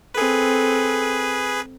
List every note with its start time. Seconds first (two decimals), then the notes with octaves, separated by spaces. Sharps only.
0.14 C4 G#4 A4 B4